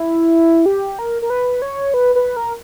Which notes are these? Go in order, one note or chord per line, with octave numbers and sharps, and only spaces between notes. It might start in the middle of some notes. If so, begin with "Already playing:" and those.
Already playing: E4
G4
A#4
A#4
B4
C#5
B4
B4
A#4